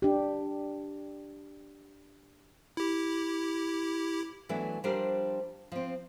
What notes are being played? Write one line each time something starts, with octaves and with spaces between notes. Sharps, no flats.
D4 G4
E4 G4
E3 F#3 A3 B3 D4
F3 G3 D4 G4 A#4 C5
F3 C4